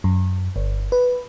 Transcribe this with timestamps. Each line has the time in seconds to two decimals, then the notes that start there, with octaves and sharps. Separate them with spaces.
0.04 F#2
0.56 G1
0.92 B4